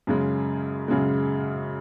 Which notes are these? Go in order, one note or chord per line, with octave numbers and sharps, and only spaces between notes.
F#2 C#3 G#3
F#2 C#3 G#3